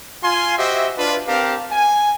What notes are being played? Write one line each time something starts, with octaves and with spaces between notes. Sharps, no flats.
F4 G#5 C6
F#4 G4 C5 D#5 E5
D4 F4 B4
C4 D4 G4 A#4 F5 A5
G#5